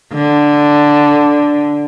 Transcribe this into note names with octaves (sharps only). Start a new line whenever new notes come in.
D3